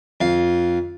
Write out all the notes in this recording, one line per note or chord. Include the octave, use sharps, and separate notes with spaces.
F2 F5